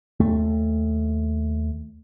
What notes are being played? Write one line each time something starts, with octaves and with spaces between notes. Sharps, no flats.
D#2 A3